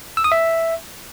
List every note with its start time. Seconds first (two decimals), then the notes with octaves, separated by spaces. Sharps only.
0.17 E6
0.24 D#6
0.32 E5